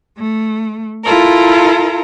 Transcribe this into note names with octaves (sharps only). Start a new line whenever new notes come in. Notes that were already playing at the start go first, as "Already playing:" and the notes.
A3
E4 F4 A4 A#4